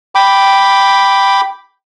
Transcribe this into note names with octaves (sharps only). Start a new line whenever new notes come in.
G5 B5 D6